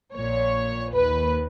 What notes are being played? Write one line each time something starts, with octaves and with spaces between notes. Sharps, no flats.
A#1 A#2 C#5
D#2 D#3 B4